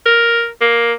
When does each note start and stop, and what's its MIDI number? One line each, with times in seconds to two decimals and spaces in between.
0.06 0.48 70
0.61 0.93 58